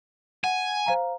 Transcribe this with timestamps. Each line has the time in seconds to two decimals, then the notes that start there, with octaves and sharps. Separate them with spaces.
0.44 F#5 G#5
0.86 C5 F5 A#5